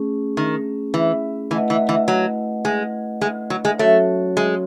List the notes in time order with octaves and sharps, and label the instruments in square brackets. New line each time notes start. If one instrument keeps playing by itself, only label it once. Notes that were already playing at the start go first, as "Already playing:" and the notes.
Already playing: [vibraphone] A3 C#4 G#4
[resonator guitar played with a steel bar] D#3
E3
[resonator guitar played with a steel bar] E3 [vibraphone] A3 E4 B4 D#5 F#5
[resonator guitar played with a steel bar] E3
E3
F#3
G#3
G#3
F#3
G#3
[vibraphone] F#3 C#4 F#4 C#5 [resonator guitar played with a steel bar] A3
[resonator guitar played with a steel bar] G#3